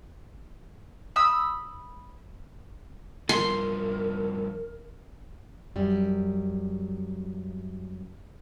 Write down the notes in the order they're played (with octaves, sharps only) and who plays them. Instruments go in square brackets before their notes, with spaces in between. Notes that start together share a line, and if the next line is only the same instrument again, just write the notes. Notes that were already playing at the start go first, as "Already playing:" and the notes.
[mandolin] B5 D#6 E6
[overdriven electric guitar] G2 F3 [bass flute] A#4 [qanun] C6
[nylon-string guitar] F#2 G3